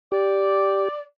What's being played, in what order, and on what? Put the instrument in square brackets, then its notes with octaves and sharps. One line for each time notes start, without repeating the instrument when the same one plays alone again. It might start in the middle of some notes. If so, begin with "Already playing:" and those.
[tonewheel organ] G4 [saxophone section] D5